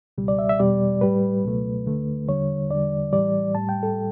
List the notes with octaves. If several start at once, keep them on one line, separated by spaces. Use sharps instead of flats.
C#2 B2 G3
D5
E5
E5
E2 B2 G3 D5
A2 G3 B4
C#2 B2 F#3 A3
D2 D3 A3
E2 D3 G3 C#5
E2 D3 G3 D5
A2 E3 G3 D5
A2 G3 A5
G5
A4